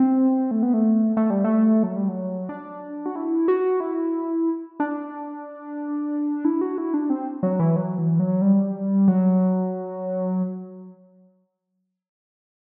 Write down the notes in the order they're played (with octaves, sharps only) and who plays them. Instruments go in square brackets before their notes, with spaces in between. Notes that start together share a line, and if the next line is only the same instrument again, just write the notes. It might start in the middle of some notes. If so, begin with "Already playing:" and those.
Already playing: [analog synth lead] C4
A3
B3
A3
A3
G3
A3
F#3
G3
F#3
D4
F#4
E4
F#4
E4
D4
E4
F#4
E4
D4
C4
F#3
E3
F#3
E3
F#3
G3
F#3